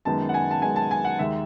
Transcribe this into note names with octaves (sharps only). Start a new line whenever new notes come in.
F#2 D#3 G#3 B3 A5
F#5
G#5
A5
F#2 D#3 G#3 B3 G#5
A5
G#5
F#5
D#2 D#3 G#3 E5